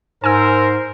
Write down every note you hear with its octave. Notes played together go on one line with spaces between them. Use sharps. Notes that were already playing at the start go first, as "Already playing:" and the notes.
G#2 A#4 C5 G#5 E6